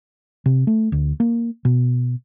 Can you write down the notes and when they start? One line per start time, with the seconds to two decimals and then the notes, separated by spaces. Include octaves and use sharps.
0.46 C3
0.67 A3
0.92 D2
1.20 A#3
1.65 B2